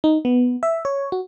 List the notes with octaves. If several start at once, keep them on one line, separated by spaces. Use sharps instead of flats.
D#4
B3
E5
C#5
F#4